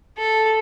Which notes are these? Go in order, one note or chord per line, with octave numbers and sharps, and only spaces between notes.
A4